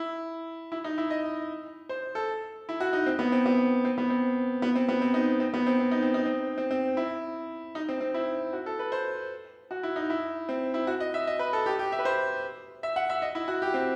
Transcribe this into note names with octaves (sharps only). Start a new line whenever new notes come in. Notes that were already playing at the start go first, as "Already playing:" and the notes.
Already playing: E4
E4
D#4
E4
D#5
C5
A4
E4
F#4
D#4
C4
B3
C4
B3
C4
B3
C4
B3
C4
B3
C4
D#4
C4
B3
C4
C4
D#4
C4
D#4
C4
C4
C4
E4
D#4
C4
C4
E4
F#4
A4
B4
C5
F#4
E4
D#4
E4
C4
E4
F#4
D#5
E5
D#5
B4
A4
G4
G4
E5
B4
C5
E5
F#5
E5
D#5
E4
F#4
G4
C4